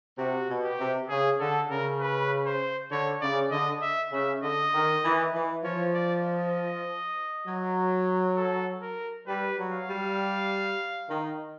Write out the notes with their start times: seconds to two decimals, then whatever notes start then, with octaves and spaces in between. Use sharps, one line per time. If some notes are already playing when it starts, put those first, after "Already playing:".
0.18 C3 F#4
0.49 B2
0.63 G4
0.79 C3
1.09 C#3 G#4
1.39 D3 A4
1.70 C#3 A#4
2.00 B4
2.46 C5
2.91 D3 C#5
3.21 C#3 D5
3.51 D3 D#5
3.82 E5
4.12 C#3 E5
4.42 D3 D#5
4.73 D#3
5.03 E3
5.33 E3
5.63 F3 C#5
5.94 D5
6.24 D#5
7.46 F#3
8.37 A4
8.82 A#4
9.27 G3 B4
9.58 F#3
9.72 F5
9.88 G3
11.09 D#3